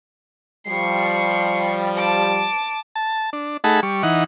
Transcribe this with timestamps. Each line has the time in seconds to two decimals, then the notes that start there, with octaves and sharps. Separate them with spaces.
0.67 F3 G3 C#6 C7
1.98 A5 D6
2.96 A5
3.33 D4
3.64 A3 D#4 G#4 F#5 A5 B5
3.83 G3 C#6
4.03 E3 D#4 F#5